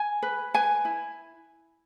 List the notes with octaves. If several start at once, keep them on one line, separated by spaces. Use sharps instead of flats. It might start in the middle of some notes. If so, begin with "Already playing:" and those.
Already playing: G#5
B4
B4 G#5
E4